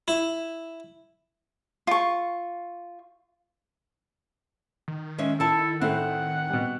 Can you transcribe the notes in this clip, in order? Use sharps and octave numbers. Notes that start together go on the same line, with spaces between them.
E4
F4 C#6
D#3
G#3 C#4 E5
E4 A4 A5
A2 A3 C4 E4 F#5
B2 G3